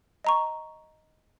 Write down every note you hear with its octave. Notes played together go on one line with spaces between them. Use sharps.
D#5 A#5 C#6